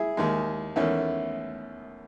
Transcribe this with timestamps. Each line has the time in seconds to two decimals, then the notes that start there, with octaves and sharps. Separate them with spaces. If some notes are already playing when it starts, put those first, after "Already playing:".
Already playing: E4 G#4
0.17 D#2 D#3 G#3
0.76 E2 D#3 A3 C#4